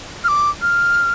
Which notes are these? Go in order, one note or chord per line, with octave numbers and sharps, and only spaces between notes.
F6
D6
F6